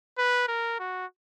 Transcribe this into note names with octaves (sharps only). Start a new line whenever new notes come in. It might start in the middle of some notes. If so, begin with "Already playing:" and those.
B4
A#4
F#4